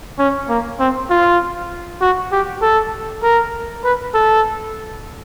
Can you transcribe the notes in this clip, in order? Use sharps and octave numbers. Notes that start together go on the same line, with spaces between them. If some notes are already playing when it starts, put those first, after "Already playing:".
C#4
A#3
C4
F4
F#4
G4
A4
A#4
B4
A4